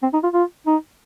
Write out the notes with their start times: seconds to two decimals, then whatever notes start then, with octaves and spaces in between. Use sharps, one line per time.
0.03 C4
0.13 D#4
0.23 F4
0.34 F4
0.67 D#4